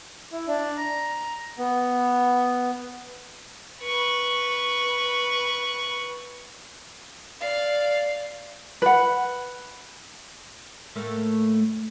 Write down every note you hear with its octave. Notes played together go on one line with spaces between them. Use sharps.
E4
D4
A#5
B3
B4 C#6
D5 F5
B4 F#5
A2 A3 A#3